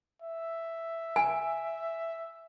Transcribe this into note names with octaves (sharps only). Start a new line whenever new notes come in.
E5
G#5